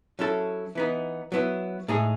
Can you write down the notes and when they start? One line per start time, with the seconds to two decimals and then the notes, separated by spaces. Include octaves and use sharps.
0.19 F#3 C#4 E4 A4
0.75 E3 B3 D#4
1.32 F#3 B3 E4
1.88 A2 G#3 D#4 G#4